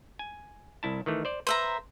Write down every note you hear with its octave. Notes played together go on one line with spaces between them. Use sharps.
G#5
C2 E4 A5
D#3 E3 A3
C5 D5
B4 C5 E5 A#5